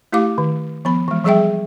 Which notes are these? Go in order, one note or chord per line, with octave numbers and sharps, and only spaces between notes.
A3 E4 G4 F5 D6
D#3
F3 B3 B5
E3 G#3
F3 G3 G#4 D#5 E5 G5